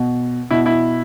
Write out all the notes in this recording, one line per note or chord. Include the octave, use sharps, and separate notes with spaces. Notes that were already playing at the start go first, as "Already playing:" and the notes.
Already playing: B2
B2 E4
E4